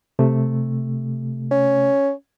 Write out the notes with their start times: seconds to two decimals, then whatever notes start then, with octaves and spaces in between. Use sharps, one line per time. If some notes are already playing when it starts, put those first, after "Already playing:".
0.19 C3 A3
1.51 C#4